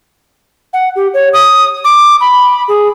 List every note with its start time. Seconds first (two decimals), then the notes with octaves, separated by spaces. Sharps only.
0.73 F#5
0.96 G4
1.14 C#5
1.33 D#6
1.84 D6
2.21 B5
2.68 G#4